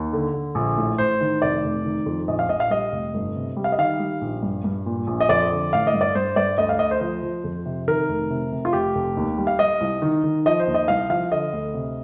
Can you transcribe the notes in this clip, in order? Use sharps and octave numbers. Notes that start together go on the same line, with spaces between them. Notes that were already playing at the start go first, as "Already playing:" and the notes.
Already playing: D#2
D3
D3
A#1
A2
A1 C5
D#3
F1 D5
F1
D#3
F2
A#1 D#5
F5
A#1 D#5
F5
G3 D#5
F1
G1
C3
G3
F5
D#5
D#3 F5
G3
A#1
G2
G2
A#2
A#1
D#5
F2 D5
D3
A1 F5
D#5
G2
D5
G2 C5
G2 D5
D2 D#5
F5
D2 D#5
C5
F3 C5
F3
F2
C3
D#3 A#4
F1
C3
C3
F4
F1 G4
F1
D#2
G3
F5
G3 D#5
C2
D#3
D#3
F3 D#5
C5
D#2
D#5
C2 F5
F3 F5
D3 D#5
D2
C3